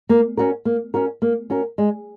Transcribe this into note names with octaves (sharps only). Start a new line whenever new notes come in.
A#3
C#4 F#4 A#4
A#3
C#4 F#4 A#4
A#3
C#4 F#4 A#4
G#3